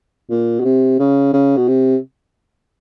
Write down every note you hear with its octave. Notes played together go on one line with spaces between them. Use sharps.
A#2
B2
C3
C#3
C#3
B2
C3